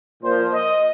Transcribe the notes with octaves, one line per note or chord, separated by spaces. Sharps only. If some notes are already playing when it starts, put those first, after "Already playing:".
A#2 F3 C5
D#5